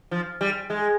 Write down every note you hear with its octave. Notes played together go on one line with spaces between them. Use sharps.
F3
G3
G#3